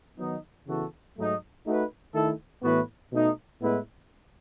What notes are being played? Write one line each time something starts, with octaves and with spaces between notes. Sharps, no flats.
D#3 F#3 B3 D#4
C#3 E3 B3 F#4 A4
G#2 F#3 A3 D#4
A3 D#4 F#4 B4
D#3 A3 E4 A4
A2 E3 B3 F#4 B4
B2 A3 D#4
A2 G#3 B3 E4 B4